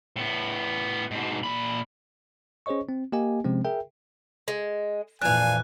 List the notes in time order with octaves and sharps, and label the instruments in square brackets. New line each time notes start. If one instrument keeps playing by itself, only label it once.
[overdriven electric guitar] A2 B3
G#2 B2
A#2 B5
[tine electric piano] C#4 G#4 C5 C#5 D#5 C#6
C4
A#3 G4 D#5 G#5
C3 F3 G#3 C4 C#4
G#4 A#4 E5 G5
[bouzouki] G#3
[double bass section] F2 A#2 E3 [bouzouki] D4 F5 [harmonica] G#5 [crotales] F#6